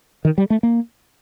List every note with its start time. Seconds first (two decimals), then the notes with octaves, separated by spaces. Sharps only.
0.25 D#3
0.38 G3
0.50 A3
0.63 A#3